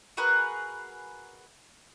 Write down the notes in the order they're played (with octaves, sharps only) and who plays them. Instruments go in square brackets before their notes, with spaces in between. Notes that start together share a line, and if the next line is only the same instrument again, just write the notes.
[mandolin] F#4 G#4 A#4 B4